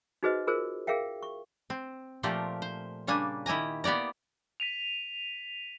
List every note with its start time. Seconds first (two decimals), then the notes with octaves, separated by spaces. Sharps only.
0.23 D#4 F#4 G#4 B4 C5 D#5
0.47 F4 G#4 A#4 C5
0.87 G#4 A#4 E5 F5 G5
1.23 C#6
1.70 C4
2.23 A#2 F3 A3 F4 G4 A#4
2.62 C5
3.07 C#3 G3 A#3 D4 G#5
3.46 D#3 E4 G4 G#5 A#5
3.84 A#3 B3 G4 D5 A#5
4.60 B6 D#7 F7